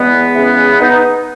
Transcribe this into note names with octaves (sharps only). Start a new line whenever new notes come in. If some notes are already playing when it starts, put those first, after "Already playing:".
Already playing: E2 G#3 B3
C#3 E3
B3 D#4